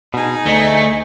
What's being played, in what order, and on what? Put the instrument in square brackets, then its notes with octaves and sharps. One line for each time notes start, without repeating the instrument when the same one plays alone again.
[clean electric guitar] B2 [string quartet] D#4 G#4
[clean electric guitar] D2 [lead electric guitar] A3 [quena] D#5